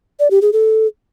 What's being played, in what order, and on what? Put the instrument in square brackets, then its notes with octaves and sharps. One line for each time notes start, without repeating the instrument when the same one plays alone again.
[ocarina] D5
G4
G#4
A4